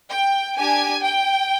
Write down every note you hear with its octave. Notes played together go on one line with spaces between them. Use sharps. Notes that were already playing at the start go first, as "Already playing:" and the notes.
G5
D4 G4 G#5
G5